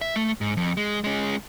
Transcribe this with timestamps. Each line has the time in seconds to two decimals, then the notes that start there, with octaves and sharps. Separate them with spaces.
0.01 E5
0.16 A3
0.41 G#2
0.57 F2
0.77 G#3
1.04 G#3 C#4